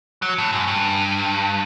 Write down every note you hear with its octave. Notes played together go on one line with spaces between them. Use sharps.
F#3
A2
F#2
G2